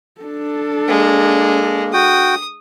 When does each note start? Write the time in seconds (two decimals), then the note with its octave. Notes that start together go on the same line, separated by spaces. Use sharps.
0.21 D4 A4
0.88 G#3 A#3
1.93 F#4 G5 D#6